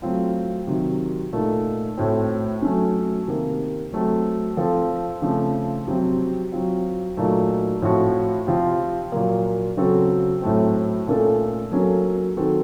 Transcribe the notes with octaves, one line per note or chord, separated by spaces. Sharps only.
F#3 A3 C4 F4
C3 D#3 F#3
A#2 A3 D#4
A2 A3 C4 F#4
F#3 A3 C#4
C3 D#3 A#3
F#3 A3 C4
F3 C4 F4 A4
C#3 F3 A3 C4
C3 F#3 C4
F#3 C4 F4
A#2 F#3 A3 D#4
A2 F3 C4 F#4
C3 F3 C4 F4
A#2 F#3 A#3
C#3 F#3 C4 F#4 A4
A2 F#3 A3 C4
A#2 A3 C#4 A4
F#3 A#3 C#4 A4
D#3 F#3 C4 F#4 A4